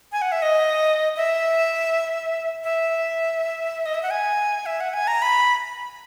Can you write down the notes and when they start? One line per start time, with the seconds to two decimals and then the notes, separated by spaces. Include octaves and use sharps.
0.12 G#5
0.22 F#5
0.32 E5
0.42 D#5
1.16 E5
2.64 E5
3.86 D#5
3.94 E5
4.03 F#5
4.11 G#5
4.66 E5
4.80 F#5
4.94 G#5
5.08 A#5
5.22 B5